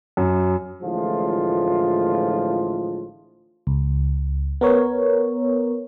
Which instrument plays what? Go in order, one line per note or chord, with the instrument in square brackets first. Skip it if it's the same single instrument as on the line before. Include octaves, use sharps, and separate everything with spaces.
[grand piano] F#2
[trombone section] A1 A2 D3 F3 G#3 F4
[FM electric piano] C#2
B3 A#4 C#5